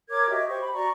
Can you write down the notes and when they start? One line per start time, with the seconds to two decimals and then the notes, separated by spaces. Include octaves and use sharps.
0.10 A#4 C#5 D6 G#6
0.30 F#4 G4 D#5 E5
0.49 G4 C5 C#6
0.61 B5
0.74 F#4 D5 A#5 C#6